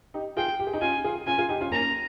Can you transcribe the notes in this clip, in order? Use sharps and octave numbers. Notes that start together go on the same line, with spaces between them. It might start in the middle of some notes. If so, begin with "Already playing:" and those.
D#4 G4
F4 G#4 G5
G4
G#4
D#4 G4
C#4 F4 G#5
F4 G#4
C#4 F4 G#5
F4 G#4
D#4 G4
C#4 F4
A#3 C#4 A#5